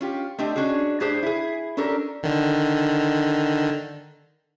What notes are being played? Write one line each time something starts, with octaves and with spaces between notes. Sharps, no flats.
C#4 F4 G4
A3 C4 D4 G4 D#5
C#4 D4 F#4 G#4
A2 D4 G4 G#4 C5
E4 G#4
C#4 D4 G4 A4 A#4
D3 D#3